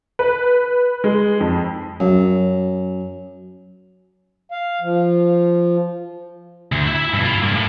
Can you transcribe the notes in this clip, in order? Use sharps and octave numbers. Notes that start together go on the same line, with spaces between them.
B4
G#3
F2
F#2
F5
F3
D2
E4 E5
G2 B2
E4 F4
G2 A#3
A2